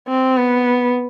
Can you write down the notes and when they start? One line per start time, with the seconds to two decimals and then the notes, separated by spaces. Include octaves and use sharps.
0.08 C4
0.37 B3